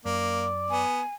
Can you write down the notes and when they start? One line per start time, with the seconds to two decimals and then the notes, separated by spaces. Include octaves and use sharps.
0.05 F#2 A#3 D5
0.70 B3 G#5